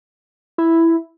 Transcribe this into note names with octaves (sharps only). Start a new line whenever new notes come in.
E4